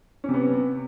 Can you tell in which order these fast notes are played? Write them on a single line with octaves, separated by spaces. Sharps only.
C#4 C3 B3